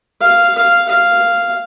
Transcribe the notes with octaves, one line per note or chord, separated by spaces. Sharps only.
F5
F5
F5